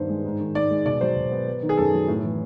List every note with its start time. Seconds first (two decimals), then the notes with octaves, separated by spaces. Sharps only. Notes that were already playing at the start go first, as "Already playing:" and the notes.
Already playing: G2 D#3 B3 C5
0.09 G#3
0.25 G#2
0.40 D#3
0.55 G#2 D5
0.70 G#3
0.85 B2 D5
1.01 F#3 C5
1.16 B2
1.31 B3
1.47 B3
1.63 D#3
1.69 G#4
1.77 F#2 A4
1.93 F#3
2.08 A2
2.24 E3